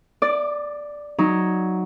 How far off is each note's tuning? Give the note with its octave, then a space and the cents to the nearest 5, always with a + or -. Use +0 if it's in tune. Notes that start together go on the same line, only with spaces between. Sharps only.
D5 +0 D6 +40
F#3 +0 D#4 +0